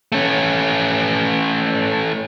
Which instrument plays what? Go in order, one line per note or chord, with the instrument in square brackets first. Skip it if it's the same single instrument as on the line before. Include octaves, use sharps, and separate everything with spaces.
[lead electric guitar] A3 C#4